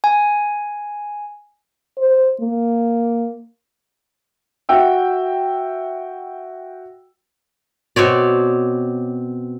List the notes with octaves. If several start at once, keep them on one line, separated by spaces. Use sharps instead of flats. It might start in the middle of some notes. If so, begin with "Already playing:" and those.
G#5
C5
A#3
F#4 E5 G5 E6
B2 C4 C#5 D5